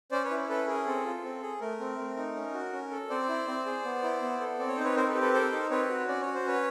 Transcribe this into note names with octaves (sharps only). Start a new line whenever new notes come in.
C#4 C5 D5
B4 C#5
E4
C#4 A4 B4
G#4 A#4
C4 A4
F4
C4
G#4
A3 A#4
C4
A3
D#4
C#4
F#4
C#4
A4
C4 C5 D5
E4
C4
G#4
B3
E4
B3
A4
C4 D5
C#5
D#4 C5
B4 C#5
C4 A#4 C5
A4 B4
G4
A4 B4
A4 A#4 C5
D#4
C4 B4 C#5
F#4
C#4 D5
C#5
F#4
C5
C#4 B4 C#5